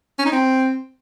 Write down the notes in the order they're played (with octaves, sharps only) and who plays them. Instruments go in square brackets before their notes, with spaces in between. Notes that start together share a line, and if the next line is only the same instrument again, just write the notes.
[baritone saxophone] C#4
D#4
C4